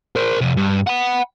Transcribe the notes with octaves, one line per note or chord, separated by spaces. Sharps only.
A#4 C5
F2 C3
G2
F#5 B5